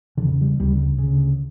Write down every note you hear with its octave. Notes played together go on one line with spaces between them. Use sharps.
D3
E2 C#3 E3
G3
D2 C#3 G3
C#3
D2